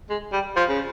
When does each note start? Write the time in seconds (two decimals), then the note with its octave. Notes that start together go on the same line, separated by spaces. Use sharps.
0.10 G#3
0.32 G3
0.57 F3
0.69 C#3